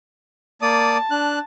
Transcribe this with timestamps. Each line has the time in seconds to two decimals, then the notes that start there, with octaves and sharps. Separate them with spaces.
0.62 A#3 D5 A5 D#6
1.11 D4 F#6